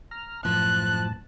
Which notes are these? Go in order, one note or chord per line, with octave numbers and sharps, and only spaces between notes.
A#5 F6
F#2 A2 F3 A5 F#6